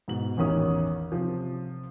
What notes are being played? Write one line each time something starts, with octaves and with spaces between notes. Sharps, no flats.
G#2 B2 F#7
A1 E2 D#3 C#4 D#6
C3 F3